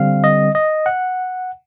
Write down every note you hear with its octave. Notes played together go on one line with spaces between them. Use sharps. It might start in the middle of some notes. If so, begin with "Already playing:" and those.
Already playing: D3 G3 C4 F5
D#5
D#5
F#5